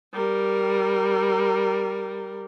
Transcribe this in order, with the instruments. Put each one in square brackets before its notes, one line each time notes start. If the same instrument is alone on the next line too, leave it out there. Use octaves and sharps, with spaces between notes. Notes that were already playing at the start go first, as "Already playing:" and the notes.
[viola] G3 A#4